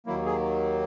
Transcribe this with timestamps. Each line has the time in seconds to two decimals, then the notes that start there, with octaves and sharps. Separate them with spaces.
0.06 D#2 D#3 F#3 A#3 E4
0.26 G#4